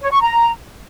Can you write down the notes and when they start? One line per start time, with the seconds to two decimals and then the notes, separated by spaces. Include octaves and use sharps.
0.01 C#5
0.12 C#6
0.22 A#5